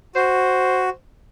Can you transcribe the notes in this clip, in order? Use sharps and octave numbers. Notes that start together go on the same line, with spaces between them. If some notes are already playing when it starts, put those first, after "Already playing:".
F#4 C5